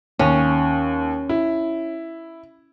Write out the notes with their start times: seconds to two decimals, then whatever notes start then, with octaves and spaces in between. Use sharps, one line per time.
0.19 D#2 C#4
1.29 E4